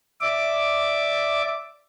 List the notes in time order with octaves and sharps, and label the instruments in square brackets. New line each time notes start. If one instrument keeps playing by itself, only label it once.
[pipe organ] D5 E5 D6